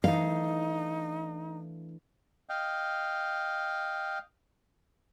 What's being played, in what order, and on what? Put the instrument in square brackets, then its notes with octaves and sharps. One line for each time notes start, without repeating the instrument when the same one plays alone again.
[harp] E3 A3 D4 [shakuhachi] D#4 [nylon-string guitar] F5
[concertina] D#5 F5 G5